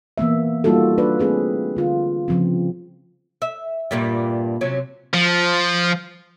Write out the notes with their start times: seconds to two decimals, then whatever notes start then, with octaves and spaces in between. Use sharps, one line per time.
0.18 E3 A#3 B3 E5
0.64 G3 A#3 D#4 F4 F#4 A4
0.98 D4 B4 D5
1.19 A3 C4 G#4 B4
1.77 D3 F4
2.28 C#3 F3 C4
3.42 E5
3.91 G2 A#2 G3
4.61 C3 F#3 C#4
5.14 F3